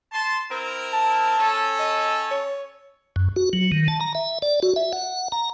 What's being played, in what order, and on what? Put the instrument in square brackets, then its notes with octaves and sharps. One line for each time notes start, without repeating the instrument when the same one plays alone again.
[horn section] A5 C6
C4 E4 A#4
[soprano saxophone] A5
[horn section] C#4 A4
[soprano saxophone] D#5
C#5
[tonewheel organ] F#2
F#4
F#3
D#3
A5
A#5
E5
D5
F#4
E5
F#5
A#5